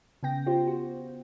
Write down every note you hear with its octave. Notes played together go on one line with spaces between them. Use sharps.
C#3 B3 G5 A#6
F4 G4 C5
F#4